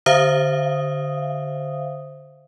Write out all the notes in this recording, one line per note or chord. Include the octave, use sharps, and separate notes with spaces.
D3 C5 E5 F5 D#6